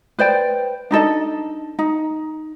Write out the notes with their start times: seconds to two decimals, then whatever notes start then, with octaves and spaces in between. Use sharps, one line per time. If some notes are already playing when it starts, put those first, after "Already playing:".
0.19 B4 C5 D5 G5
0.91 D4 D#4 A4 D#5
1.79 D#4